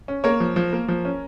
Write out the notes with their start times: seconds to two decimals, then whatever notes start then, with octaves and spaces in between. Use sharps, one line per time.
0.08 C#4
0.24 A#3 A#4 C#5
0.40 F3
0.56 F3
0.73 A#3
0.88 F3
1.05 C#4